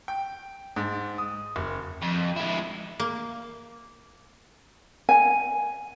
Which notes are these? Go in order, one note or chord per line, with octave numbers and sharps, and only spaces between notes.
G5
G#2
D#6
F#1
F2
G#3 E4
A#3
G#5